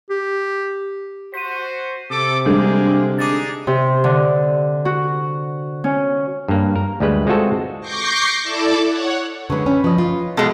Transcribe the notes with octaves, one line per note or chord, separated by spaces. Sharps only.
G4
F#4 C5 B6 D#7
C3 A4 D6
D3 G3 G#3 A#3 G#4
D4 D#4 G#4 D6 A6
C3
D3
F#4
C#4
G2 A#3
A#4
D2 G3 G#3 B4
G#3 C4 F4 F#4 A4 E5
C#6 D6 G6 A#6 C7
E4 A4 D5 A5 D6
C#5 F#5
D3 G#3 B4 C#5
C#4 G5 B5
F3 B4 D#5
F4
B2 G#3 A4 F5